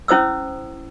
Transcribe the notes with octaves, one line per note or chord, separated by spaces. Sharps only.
C#4 E4 C5 D#6 E6